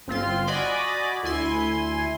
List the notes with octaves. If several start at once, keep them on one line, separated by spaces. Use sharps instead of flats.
G1 C4 F4 C6
F#4 D5 D#5 G#5 B5 D6
D2 E4 G#5 C6